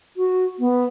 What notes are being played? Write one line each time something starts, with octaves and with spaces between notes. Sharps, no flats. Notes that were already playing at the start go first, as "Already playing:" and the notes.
F#4
B3